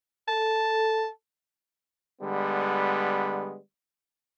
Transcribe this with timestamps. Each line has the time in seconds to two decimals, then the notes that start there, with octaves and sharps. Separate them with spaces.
0.28 A4 A5
2.21 D3 G3 G#3 B3